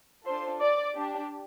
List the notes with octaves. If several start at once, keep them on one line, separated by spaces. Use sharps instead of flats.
D4 F4 A4 C5 C6
D5 D6
D4 G4